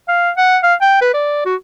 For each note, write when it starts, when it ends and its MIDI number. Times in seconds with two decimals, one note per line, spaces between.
0.08 0.31 77
0.37 0.58 78
0.63 0.74 77
0.81 0.99 79
1.01 1.10 71
1.14 1.41 74
1.45 1.55 66